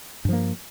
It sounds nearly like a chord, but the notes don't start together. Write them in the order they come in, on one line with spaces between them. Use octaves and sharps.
G2 F3 A#3